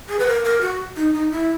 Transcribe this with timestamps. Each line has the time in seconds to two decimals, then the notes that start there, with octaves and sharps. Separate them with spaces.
0.09 G#4
0.19 B4
0.27 A#4
0.44 A#4
0.61 F#4
0.96 D#4
1.14 D#4
1.31 E4